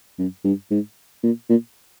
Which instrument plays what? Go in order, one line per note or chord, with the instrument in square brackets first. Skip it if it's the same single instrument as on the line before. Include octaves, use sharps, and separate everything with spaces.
[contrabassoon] F#2
G2
G#2
A#2
A#2